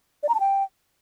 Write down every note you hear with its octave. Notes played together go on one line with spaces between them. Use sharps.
D5
A#5
A5
G5